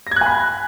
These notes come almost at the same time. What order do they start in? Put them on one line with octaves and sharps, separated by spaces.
A#6 G#6 F#6 G#5 B5